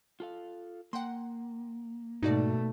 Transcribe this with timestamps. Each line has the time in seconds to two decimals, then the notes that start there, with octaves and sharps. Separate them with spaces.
0.20 F4 A4 F5
0.93 A#3 F#5 G5 C6
2.23 G#2 B2 A3 D#4 F#4 D5